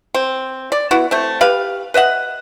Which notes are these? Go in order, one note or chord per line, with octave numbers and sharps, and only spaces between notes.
C4
D5
B3 E4 F#4
A3 C4
G4 B4 F5
B4 D#5 E5 F#5